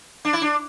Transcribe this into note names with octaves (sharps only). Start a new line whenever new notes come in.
D4
E4
D4